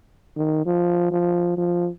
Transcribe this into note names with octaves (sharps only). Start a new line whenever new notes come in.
D#3
F3
F3
F3